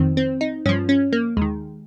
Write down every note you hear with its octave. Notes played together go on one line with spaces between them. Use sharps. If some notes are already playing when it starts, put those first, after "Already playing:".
Already playing: F2 D#3 C4
C4
D#4
G2 F3 C#4
C#4
A#3
D#2 D#3 G#3